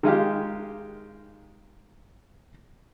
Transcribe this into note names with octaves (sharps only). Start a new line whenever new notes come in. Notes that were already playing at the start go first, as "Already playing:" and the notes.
D#3 G#3 F4 G4